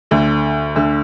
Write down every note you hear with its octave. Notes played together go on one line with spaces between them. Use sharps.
D2 D3
D2 D3